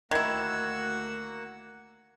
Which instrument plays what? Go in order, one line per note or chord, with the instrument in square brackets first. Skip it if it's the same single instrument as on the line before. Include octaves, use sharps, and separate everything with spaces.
[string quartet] D2 F#4 E6 [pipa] D#3 E4 [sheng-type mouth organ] A#3 F#5 [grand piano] G#6